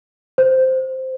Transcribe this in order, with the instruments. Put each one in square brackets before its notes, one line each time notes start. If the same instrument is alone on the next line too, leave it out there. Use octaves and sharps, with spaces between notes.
[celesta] C5